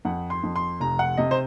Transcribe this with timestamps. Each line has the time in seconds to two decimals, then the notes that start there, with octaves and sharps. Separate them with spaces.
0.05 F2 F#5
0.30 C6
0.43 F2
0.56 C6
0.80 F1 A#5
0.99 F#5
1.17 C3 D#5
1.31 C5